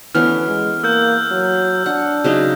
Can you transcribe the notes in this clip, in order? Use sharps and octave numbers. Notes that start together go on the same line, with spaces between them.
D2 E3 B3 C#4 F6
G#3
A#3 E6 F#6 G6
F#3
D4 F#5
C#3 F#3 D#4